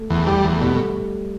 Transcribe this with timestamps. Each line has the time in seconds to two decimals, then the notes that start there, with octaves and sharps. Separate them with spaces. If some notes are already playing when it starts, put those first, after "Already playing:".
Already playing: A3
0.10 E2
0.27 G3
0.44 E2
0.56 A3
0.61 B2 G3
0.74 A3